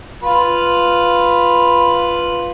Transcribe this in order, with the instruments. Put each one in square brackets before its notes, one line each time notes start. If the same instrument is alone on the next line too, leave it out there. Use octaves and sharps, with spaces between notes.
[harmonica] F4 B4